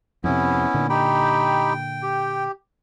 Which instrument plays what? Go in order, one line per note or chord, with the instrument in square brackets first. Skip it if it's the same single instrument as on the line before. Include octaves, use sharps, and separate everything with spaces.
[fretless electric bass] F2 C3 [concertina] B3 C#4 E4
[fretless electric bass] A#2 D3
[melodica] D#4 G4 B5 [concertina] G5
[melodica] G4